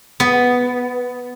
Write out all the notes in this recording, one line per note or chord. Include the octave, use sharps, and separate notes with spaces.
B3